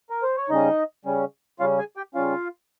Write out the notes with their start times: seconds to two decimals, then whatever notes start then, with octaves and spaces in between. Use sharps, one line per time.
0.10 A#4
0.23 C5
0.37 C#5
0.49 C#3 G3 C#4 D#4 D#5
1.05 C#3 G3 C#4
1.60 C#3 G3 C#4 F4 F5
1.78 G#4 G#5
1.97 G4 G5
2.15 C#3 G3 C#4 F4 F5